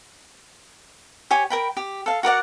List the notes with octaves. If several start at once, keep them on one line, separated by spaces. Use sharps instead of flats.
G4 C#5 G#5
A#4 G5 B5
G4
A4 F5
F#4 A#4 D5 F#5